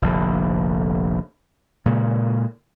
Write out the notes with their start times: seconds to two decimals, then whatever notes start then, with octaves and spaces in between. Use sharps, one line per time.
0.02 F1 A#1 D3
1.86 A#2 C#3 G#3